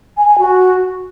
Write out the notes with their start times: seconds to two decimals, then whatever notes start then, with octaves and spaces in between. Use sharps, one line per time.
0.17 G#5
0.28 G#5
0.39 F#4